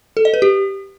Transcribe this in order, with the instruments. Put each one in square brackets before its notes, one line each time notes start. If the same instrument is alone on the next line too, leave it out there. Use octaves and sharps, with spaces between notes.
[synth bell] A4
D#5
B4
G4